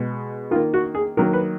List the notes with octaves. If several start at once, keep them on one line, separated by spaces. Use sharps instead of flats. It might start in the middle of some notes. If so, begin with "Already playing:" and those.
Already playing: B2 G#3
D#3 A#3 F4
F#4
G#4
D#3 F#3 A#3 A#4
B4